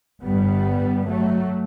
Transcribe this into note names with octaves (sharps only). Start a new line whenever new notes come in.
G1 G2 G3 B3
F#3 A3